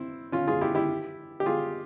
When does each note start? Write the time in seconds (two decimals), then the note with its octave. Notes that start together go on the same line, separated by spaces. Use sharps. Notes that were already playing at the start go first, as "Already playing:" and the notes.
Already playing: C4 E4
0.32 C#4 F4
0.47 F4 G#4
0.61 E4 G4
0.75 E4 G4
1.40 G4
1.46 F4 G#4